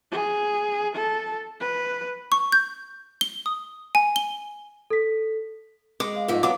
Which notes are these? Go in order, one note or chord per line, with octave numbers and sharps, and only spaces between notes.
G#4
A4
B4
C#6
G6
G7
D#6
G#5
G7
A4 B6
G#3 D6
F5
F2 G#2 A3 F4
F#3 B3 F5 D6